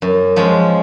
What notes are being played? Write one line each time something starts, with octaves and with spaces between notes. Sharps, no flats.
F#2
F3 G#3 C#4